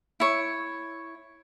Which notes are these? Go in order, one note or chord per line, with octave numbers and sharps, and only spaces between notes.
E4 C#5